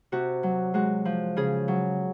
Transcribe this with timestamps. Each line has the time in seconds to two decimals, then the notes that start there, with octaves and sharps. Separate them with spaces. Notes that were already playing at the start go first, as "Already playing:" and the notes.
0.12 C3 F#4
0.43 F#3
0.74 G#3 F#4
1.05 F3
1.37 C#3 G#4
1.68 F#3